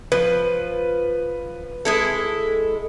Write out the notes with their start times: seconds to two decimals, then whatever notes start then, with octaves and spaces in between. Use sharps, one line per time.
0.12 F3 B4
1.85 G#3 E4 A4